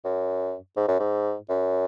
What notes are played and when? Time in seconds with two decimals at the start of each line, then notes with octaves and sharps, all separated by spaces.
0.04 F#2
0.76 G#2
0.88 F#2
0.99 G#2
1.49 F#2